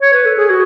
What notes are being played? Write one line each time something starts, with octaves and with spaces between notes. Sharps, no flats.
C#5
B4
A4
G#4
F#4